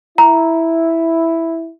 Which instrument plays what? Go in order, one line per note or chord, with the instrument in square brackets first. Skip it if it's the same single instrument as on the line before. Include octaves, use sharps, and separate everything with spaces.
[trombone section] E4 [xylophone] A#5